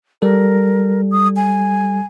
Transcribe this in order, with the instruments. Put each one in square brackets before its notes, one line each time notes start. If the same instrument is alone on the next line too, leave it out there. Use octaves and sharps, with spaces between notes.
[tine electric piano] G3 A4 [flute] A#4
[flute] D#6
G#5